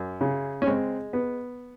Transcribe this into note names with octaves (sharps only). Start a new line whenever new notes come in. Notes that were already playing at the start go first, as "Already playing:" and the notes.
Already playing: F#2
C#3
C#4
G#3 C4
B3